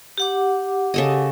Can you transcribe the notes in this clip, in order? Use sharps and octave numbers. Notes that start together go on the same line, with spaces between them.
G4 F#5 D6
C#3 A4 D#5